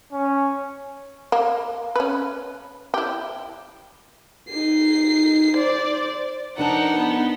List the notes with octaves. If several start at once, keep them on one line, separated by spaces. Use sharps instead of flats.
C#4
A#3
C#4 B4
E4 G4
D#4 C7
C5 D5
F2 D4 D#4 A#4 B4 F#5 A5
B3